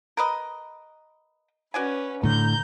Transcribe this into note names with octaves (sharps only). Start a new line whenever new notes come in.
A#4 B4 D#5
C#4 F#4 B4 D5 G#5
A2 D3 A#5 G6